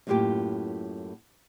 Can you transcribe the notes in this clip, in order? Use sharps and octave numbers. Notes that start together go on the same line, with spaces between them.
F#2 A2 A#3 F4 G4 G5